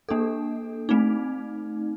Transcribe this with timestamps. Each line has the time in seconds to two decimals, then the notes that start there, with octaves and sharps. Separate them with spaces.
0.09 A#3 D4 A4
0.89 A3 C4 D#4